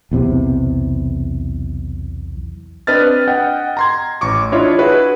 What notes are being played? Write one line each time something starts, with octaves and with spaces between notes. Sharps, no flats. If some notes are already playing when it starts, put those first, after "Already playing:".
B1 E2 C3
C4 D4 B4 D#5 F6 A6
D#5 F#5 G5
A#5 C6 G#6
A1 C#6 D6
D4 E4 F4 C#5 D#5
E4 F#4 G#4 B4